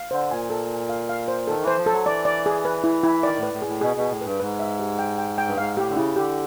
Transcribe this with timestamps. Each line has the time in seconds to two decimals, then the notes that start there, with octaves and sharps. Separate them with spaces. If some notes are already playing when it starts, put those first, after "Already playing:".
Already playing: F5
0.11 D3 C5
0.31 A#2 G#5
0.50 A4
0.70 G#5
0.89 F5
1.09 F5
1.28 C5
1.47 D#3 A4
1.62 E3
1.67 C5
1.77 F3
1.86 A4
1.92 F#3
2.06 E3 D5
2.25 D5
2.46 G#4
2.65 B4
2.84 E4
3.04 E4
3.23 D#3 D5
3.38 A2
3.43 B4
3.53 A2
3.62 G#4
3.68 A2
3.81 B2 G#4
3.96 B2 G#4
4.11 A2
4.21 G2 B4
4.40 G#2 B4
4.60 E5
4.79 G4
4.99 G5
5.18 G5
5.38 G5
5.47 G2
5.58 G#2 F5
5.77 A2 G4
5.89 D3
5.97 C#3 E4
6.16 D3 G4